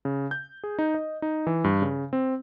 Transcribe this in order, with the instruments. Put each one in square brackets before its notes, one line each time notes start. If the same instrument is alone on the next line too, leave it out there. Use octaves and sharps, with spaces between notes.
[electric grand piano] C#3
G6
G#4
D#4
D#5
D#4
E3
G2
C#3
C4